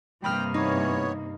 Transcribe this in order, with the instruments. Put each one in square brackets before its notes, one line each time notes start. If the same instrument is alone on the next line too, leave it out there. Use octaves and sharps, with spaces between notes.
[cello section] G2 C3 A#3 [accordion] G5 [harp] B5 D#6 F6
[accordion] E3 B3 C#5 [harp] D#4